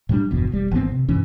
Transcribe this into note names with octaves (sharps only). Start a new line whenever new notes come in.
A2 F#3 G3 D4
G1 E2 B2
E1 G3
G#1 E3 B3 C4
C3
G2 B2 E3 C#4